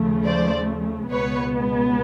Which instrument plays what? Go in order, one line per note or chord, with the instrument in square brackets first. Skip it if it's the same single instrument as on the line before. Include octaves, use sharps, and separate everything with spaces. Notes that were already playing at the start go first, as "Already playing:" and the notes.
Already playing: [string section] D#2 C#3 F3 A3
C5 D5
C#2 B2 G#3 B3 B4 C#5